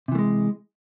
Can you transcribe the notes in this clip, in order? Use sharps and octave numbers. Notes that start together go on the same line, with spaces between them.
C3 E3 G#3 A3